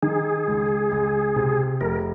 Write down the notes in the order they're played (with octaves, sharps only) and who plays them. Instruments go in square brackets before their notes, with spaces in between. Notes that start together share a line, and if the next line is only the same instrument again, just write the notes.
[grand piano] D#3 [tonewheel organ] G#4
[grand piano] C#2
C#2
C3
[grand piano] F1 [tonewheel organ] A#4